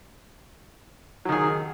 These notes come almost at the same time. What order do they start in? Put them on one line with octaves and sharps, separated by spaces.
F#3 D#3 G#4